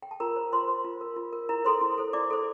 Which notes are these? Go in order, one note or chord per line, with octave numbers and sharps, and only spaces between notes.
G5
A5
F4 A#4 A#5
C5
F4 C5 C6
C5
F4
A#4
F4
A#4
E4 A#4 A#5
A4 C5 C6
E4
A4 C5
E4 D5 D6
A4 C5